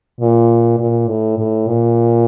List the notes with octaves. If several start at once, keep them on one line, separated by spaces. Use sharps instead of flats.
A#2
A#2
A2
A2
A#2